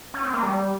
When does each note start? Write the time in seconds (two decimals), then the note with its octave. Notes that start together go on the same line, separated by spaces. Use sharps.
0.14 C#4
0.23 C4
0.33 A#3
0.43 G3